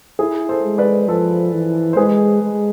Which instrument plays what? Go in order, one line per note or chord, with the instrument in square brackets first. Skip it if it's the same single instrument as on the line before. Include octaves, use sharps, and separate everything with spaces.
[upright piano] E4 G#4
A4 C5
[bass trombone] G#3
[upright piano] B4 D5
[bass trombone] F3 [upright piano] A4 C5
[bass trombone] E3
[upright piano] C5
[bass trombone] G#3 [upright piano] G#4 B4
[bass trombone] G#3